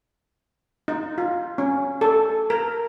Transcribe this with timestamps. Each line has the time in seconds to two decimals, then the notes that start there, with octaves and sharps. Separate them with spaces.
0.88 D#4
1.18 F4
1.58 C#4
2.01 A4
2.50 A#4